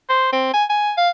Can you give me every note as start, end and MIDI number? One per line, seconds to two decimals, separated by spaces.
0.09 0.29 72
0.33 0.49 60
0.54 0.64 80
0.70 0.92 80
0.97 1.10 77